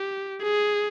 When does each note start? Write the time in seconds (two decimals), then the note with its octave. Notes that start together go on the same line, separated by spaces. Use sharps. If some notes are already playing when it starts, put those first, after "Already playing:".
Already playing: G4
0.43 G#4